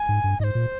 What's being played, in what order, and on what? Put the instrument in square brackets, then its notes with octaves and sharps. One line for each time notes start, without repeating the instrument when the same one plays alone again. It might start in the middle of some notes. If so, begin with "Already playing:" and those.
Already playing: [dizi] G#5
[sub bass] G#2
G2
[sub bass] G#2 [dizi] D#5
[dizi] C5
[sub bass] A#2